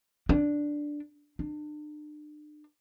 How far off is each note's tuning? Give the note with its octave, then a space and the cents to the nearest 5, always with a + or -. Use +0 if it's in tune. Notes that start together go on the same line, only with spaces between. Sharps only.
D4 +0
D4 +40